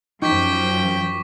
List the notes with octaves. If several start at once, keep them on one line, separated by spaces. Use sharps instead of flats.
F#2 F3 D#4 G5 C#6 D6 B6